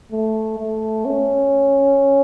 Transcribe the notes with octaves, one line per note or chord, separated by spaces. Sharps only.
A3
A3
C#4